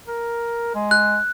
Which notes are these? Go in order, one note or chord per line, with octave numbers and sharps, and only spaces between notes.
A#4
G#3
F#6